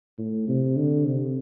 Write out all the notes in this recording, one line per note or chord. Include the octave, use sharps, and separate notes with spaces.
A2
C3
D3
C3